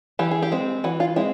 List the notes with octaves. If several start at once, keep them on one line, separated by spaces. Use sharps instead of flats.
E3 G4
G#4
G4
G#3 C4
E3 F#4
F4
G#3 C4 E4